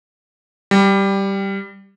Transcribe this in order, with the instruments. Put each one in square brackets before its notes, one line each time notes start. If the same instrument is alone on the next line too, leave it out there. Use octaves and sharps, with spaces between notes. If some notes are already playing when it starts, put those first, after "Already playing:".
[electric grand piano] G3